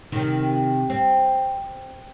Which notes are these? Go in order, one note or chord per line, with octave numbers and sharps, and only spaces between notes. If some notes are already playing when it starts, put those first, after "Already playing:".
C3 D#3
C4